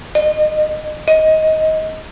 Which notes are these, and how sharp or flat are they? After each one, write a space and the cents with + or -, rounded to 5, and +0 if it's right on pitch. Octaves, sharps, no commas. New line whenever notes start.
D#5 -35
D#5 +15